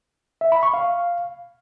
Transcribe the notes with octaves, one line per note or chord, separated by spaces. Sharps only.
E5
B5
C#6
F5